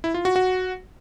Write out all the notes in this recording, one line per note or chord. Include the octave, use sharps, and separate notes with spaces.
E4
F4
F#4
F#4